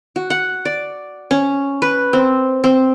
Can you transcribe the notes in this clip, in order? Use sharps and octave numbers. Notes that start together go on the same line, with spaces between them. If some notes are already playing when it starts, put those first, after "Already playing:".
F#4
F#5
D5
C#4
B4
C4
C4